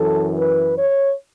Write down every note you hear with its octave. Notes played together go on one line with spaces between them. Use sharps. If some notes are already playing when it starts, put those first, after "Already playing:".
Already playing: F#2 E3 A4
B4
C#5